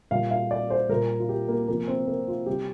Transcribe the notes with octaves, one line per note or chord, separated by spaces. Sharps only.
A#2 G3 F5
F5
D5
C5
A#2 G3 A#4
F4
G4
A#3
C3 F3 A#3
C4
A#3
F4
C3 G3 G4